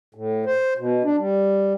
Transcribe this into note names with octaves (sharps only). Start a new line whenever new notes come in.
A2
C5
B2
D4
G3